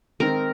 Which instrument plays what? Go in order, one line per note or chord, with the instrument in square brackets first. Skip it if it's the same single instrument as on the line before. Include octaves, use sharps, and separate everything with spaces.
[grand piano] D#3 G#3 C4 D#4 G#4 [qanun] A#4